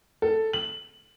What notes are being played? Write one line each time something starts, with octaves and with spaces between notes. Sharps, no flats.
A4
F#7